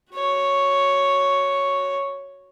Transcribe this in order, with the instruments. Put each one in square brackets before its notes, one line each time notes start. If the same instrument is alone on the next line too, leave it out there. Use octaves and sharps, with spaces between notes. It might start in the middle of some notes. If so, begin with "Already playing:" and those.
[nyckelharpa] F#4 C#5